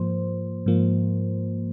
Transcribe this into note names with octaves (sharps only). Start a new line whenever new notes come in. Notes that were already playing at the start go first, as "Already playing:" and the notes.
Already playing: G#2 F3 A#3 C5
G#2 F3 A#3